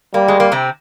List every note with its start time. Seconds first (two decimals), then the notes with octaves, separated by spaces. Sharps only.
0.14 G3 A#3
0.28 G#3
0.40 A#3
0.52 C3 C4